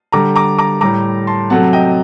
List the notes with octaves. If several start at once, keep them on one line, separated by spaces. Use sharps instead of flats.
D3 G3 A#5 D6
A#5 D6
A#5 D6
A2 G3 A#5 D6
A5 C6
C3 F#3 A3 F#5 A5
D#5 G5
D#5